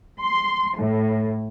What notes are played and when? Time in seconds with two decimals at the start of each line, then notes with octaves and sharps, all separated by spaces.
0.20 C6
0.77 A2